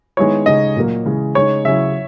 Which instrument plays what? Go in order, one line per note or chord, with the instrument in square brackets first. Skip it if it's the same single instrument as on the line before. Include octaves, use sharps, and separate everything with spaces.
[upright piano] D#3 G#3 B3 E4 [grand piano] C#5
[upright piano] C#3 G#3 D#4 [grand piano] D#5
[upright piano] A#2 F#3 A#3
C#3 E3 G#3
[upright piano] C#3 G#3 D#4 [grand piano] C#5
[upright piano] C#3 F#3 C#4 E4 [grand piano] E5